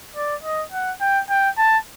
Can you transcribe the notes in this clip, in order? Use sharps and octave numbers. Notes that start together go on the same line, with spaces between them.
D5
D#5
F#5
G5
G5
A5